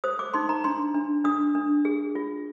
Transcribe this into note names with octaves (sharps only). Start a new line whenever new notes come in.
C5 D#6
D6
D#4 C6
A#5
D4 C6
D4
D4 D#6
D4
G#4
F4